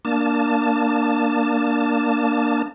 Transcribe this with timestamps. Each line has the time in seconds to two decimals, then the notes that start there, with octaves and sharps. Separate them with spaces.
0.05 A#3 D4 A5